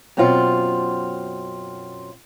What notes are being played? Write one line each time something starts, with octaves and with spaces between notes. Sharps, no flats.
F#2 B2 C4 F4